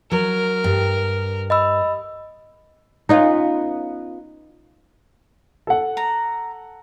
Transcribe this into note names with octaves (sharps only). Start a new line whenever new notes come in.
F#3 A#4
G2
D#5 B5 E6
B3 C#4 D#4 F4
A4 F#5
A#5